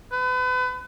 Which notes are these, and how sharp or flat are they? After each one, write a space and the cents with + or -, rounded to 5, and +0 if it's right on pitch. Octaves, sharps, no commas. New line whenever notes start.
B4 +35